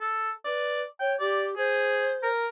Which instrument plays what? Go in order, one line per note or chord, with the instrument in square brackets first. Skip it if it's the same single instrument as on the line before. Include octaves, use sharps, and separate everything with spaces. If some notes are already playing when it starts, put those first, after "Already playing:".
[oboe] A4
[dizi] B4 [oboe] D5
[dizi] C#5 [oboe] G5
[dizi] G4 [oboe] D5
[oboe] G#4 [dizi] C5
[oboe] A#4